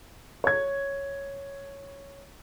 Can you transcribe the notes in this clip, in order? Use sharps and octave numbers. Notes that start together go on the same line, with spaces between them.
C#5 G#6